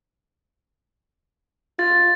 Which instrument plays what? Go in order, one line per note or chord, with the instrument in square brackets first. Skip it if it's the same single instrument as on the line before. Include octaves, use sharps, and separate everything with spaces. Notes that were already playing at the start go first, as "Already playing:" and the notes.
[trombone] F4 [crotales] A6